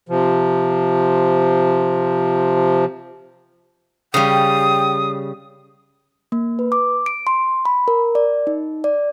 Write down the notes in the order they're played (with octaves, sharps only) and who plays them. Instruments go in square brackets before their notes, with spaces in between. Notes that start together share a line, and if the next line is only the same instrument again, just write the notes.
[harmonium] C3 F3
[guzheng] C#3 G3 [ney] G5 [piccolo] D#6
[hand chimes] A#3
B4
D6
D7
C6
B5
A#4
D5
D#4
D5